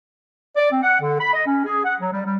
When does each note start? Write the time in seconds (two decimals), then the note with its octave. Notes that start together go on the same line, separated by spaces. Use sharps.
0.56 D5
0.71 C4
0.82 F#5
1.00 D3
1.19 B5
1.33 D#5
1.46 C#4
1.65 G#4
1.84 F#5
2.00 F#3
2.12 G3
2.25 G3